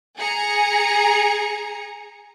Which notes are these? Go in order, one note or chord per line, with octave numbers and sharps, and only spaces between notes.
G#4 G#5 A#5 C#7